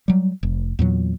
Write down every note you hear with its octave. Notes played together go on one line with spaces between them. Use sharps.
F#3 G3
F1
E2 A#2 F#3